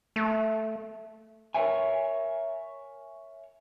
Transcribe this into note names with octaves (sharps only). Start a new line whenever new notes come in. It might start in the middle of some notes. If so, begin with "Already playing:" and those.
A3
A#4 C#5 E5 G#5